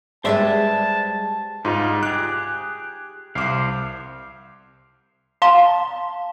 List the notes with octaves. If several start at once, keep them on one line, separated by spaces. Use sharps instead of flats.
G3 G#3 B4 C5 D5 E5 A5
G#2 G3 D#4 F4
G4 G#4 F#6
C2 C5 F5 D6
F5 A5 A#5 C6